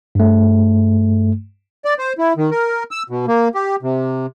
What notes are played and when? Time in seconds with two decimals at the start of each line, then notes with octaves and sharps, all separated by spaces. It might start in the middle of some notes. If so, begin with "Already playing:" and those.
0.15 G2 A3
1.85 D5
1.99 C5
2.18 E4
2.37 D#3
2.51 A#4
2.91 E6
3.10 B2
3.28 A#3
3.55 G4
3.82 C3